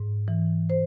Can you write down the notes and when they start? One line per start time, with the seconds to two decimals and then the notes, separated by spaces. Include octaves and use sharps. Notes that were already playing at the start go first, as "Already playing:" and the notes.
Already playing: G#2
0.28 E3
0.70 C5